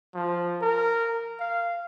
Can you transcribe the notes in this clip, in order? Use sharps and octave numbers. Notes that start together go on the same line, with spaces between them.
F3
A#4
F5